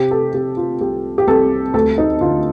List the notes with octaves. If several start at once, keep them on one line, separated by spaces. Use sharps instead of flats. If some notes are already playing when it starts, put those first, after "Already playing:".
Already playing: C3 G4
A4
C3 G4
F4
C2 G4
G4
C2 A4
D2 A4
D#4
D3 F4